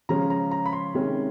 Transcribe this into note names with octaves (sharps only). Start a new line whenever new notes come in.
C#3 F3 G#3 C#4 A#5
A#5
A#5
B5
C6
C3 D#3 G#3 C#4